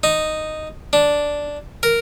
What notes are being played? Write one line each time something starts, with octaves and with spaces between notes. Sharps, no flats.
D#4
D4
A#4